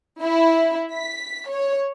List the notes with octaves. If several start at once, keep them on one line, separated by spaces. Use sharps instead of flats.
E4
B6
C#5